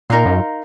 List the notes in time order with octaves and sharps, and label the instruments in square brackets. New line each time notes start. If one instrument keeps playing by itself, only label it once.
[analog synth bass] A#2 [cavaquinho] D#4 A#4 F5 C6
[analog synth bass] F#2